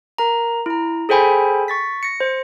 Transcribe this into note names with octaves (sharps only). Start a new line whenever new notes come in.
A#4 A#5
E4 A#5
G#4 A4 C5 G5 G#5 B5
C#6 A6 B6
A#6 C#7
C5